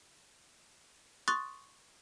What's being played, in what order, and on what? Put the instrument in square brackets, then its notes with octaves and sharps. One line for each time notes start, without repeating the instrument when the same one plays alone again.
[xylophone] C6 C#6 D#6 F#6 A6